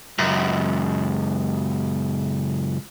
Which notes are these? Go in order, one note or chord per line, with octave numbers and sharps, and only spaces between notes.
C#2 F#2